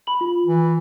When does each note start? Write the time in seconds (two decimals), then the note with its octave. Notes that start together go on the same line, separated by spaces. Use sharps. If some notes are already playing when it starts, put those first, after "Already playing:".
0.07 B5 F#7
0.21 F4
0.46 E3